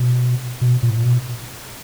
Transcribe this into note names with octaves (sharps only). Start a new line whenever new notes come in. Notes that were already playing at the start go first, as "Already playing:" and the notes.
Already playing: B2
B2
A#2
A2
A#2
B2